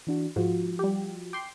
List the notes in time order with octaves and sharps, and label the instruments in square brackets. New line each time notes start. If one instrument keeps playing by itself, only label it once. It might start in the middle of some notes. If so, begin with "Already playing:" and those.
[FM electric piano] E3 D4 F#4
[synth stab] G#2 [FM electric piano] F3 F4 F#4
[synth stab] G3 G4
[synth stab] G5 C6 [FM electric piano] D6